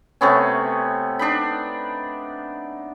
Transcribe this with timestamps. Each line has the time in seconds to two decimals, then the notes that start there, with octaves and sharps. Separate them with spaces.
0.21 C3 A3 B3 C#4
1.19 D4 D#4 B5